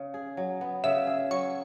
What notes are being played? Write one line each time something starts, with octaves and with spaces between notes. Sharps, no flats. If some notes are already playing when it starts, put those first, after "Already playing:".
Already playing: C#3
G#4
F#3
B3
C#3 E5
G#4
F#3 C#6